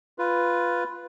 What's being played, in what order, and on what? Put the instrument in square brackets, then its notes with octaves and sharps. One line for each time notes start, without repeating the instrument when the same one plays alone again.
[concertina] F4 B4